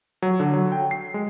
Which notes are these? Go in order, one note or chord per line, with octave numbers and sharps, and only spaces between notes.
F#3
D3
F#3
G5
C7
G#3